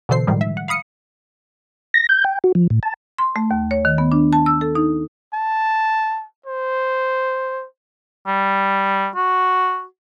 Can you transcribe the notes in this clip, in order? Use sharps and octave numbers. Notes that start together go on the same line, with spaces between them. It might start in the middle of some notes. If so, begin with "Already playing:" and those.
B2 D3 E3 A4 C5 C7
A2 D#3 F3 G3 G#3
E5
F#5
F5 B5 D#6 C#7
A#6
G6
G5
F#4
F3
A2
A5
C6
A3
D#2
C#5
D#3
B3
D4
A5
E6
A4
D#4
A5
C5
G3
F#4